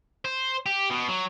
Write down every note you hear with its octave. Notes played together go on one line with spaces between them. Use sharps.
C5
G4
B2
F#3